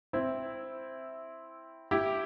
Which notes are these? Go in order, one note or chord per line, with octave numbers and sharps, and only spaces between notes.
C4 E4
E4 G4